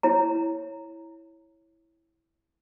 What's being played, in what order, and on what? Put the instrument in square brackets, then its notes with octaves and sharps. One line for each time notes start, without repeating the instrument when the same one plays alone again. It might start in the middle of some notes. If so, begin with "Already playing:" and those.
[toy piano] E4 C#5 A#5